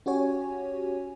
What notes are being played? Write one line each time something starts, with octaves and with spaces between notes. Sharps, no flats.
C#4 F#4 G4 C#5 G#5